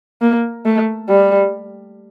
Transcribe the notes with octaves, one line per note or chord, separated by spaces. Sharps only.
A#3
A3
G3